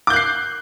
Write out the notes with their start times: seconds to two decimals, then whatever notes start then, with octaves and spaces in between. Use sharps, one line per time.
0.07 D6
0.10 G6
0.13 F#6
0.16 C7